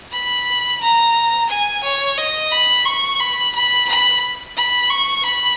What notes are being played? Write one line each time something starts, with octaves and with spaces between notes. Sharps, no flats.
B5
A#5
G#5
C#5
D#5
B5
C#6
B5
B5
B5
B5
C#6
B5